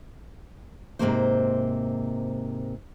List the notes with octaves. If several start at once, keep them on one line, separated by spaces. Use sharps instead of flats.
G#2 C3 F3 G#3 A#3 C5